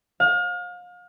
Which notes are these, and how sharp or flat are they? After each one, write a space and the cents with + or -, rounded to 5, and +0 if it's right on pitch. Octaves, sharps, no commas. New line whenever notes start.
F5 +35